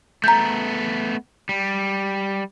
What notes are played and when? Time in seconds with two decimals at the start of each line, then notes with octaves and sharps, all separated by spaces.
0.24 A3 B3 A#5 G6
1.49 G3